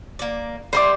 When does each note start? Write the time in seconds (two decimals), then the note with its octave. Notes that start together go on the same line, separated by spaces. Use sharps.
0.19 A#3 D5
0.73 G3 E4 C5 C6 D6